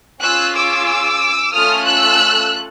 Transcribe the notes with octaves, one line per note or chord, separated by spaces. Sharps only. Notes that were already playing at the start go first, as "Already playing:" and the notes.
C#4 F4 G#4 E6 F#6
D6 E6
A3 C#4 F4 A4 D#6 F6
E6 F#6